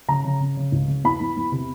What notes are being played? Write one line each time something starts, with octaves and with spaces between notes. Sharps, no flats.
C#3 A#5
C#3
C#3
C#3
C#2
C#3
E2 B5
E2
E2
C3